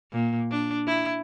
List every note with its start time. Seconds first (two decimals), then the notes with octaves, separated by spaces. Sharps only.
0.13 A#2
0.51 D4
0.87 E4